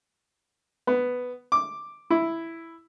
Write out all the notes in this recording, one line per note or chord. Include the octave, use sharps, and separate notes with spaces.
B3
D6
E4